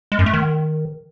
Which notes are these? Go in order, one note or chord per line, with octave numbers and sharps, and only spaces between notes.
G#3
F#2
A3
D#3